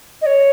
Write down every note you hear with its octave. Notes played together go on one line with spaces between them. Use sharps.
D#5
C#5